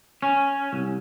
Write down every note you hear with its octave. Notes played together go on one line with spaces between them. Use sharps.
C#4
C2